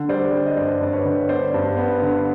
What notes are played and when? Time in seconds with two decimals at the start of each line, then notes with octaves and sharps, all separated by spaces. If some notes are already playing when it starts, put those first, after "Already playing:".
Already playing: D3
0.09 G3 C5 D5
0.33 G3
0.46 D#5
0.57 G2 C5 D5
0.81 G2 D5
0.93 B4 C#5
1.05 D3
1.29 B3 C5 D5
1.54 G2
1.77 B3
2.02 D3